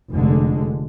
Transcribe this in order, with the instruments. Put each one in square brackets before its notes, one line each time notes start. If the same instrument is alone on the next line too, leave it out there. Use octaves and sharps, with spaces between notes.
[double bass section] F1 D3 G#3